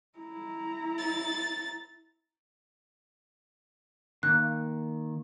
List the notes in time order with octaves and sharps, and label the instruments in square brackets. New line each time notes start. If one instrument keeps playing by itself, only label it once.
[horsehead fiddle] E4 A#5
[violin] A6
[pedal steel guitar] D#3 [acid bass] A#3 [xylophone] F#6